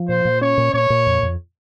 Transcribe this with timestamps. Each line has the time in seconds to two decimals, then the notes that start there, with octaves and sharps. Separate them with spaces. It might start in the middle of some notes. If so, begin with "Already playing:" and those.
Already playing: F3
0.08 A#2 C5
0.25 A#2
0.41 C#4 C#5
0.58 A#2
0.73 A#2 C#5
0.90 A#2
1.06 F2
1.23 F2